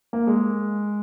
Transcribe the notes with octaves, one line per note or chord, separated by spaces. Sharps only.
A#3
G#3